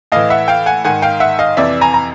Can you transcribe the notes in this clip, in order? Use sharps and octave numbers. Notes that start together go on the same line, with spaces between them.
A2 E3 D#5 F5
E5 F#5
F5 G5
F#5 G#5
G#2 D#3 F#5 G#5
F5 G5
E5 F#5
D#5 F5
F2 C3 E3 D5 E5
G#5 A#5
A#5